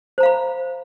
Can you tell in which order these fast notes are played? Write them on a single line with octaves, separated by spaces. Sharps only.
C5 A#5 F5 B5